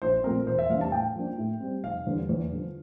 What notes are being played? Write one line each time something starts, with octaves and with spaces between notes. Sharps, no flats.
A#1 C5
A#2 F3 A3 C4 A#4
E1 C5
E5
E2 C3 G3 D4 F5
A5
A2 G5
F3 A#3 D4
A2
G3 C4
F1 F5
E2 D3 G3 D4
E2
D3 F3